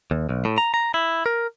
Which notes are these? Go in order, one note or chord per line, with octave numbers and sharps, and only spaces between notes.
D#2
B1
A2
A#5
A#5
E4
A#4